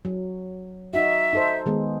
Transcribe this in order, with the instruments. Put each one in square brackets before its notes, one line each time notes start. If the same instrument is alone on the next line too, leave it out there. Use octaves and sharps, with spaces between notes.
[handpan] F#3
[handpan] D#4 F#4 [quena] E5
[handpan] D#4 A4 C5
D#3 G#3 B3